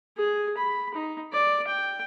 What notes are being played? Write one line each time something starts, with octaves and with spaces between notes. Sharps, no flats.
G#4
B5
D#4
D5
G5